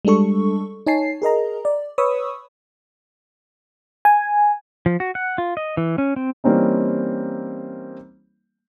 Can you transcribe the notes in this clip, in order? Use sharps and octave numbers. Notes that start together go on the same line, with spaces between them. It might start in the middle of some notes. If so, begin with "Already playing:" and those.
G3 G#3 D4 A4 C#6
D#4 C#5 G#5 A5 C7
G#4 A#4 D#5 A#5
D5
B4 C#5 B5 C#6 D#6 E6
G#5
F3
F#4
F#5
F4
D#5
E3
C#4
C4
E3 G3 A#3 C4 C#4 D#4